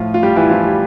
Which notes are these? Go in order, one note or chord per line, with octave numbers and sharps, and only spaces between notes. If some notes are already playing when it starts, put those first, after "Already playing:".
Already playing: A2 F3 F4
F4
G3 G4
E3 E4
F3 F4
G3 G4